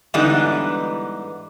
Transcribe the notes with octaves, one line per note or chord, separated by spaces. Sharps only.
G#2 D3 E3 G3 B3 D#4